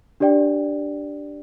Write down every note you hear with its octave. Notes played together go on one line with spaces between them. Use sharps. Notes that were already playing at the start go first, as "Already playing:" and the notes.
D4 G4 D5 G5